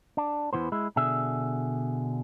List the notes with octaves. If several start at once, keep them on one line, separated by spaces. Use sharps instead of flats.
D4
E2 E3 B3 C5
G#3 E4
B2 D3 G#4 E5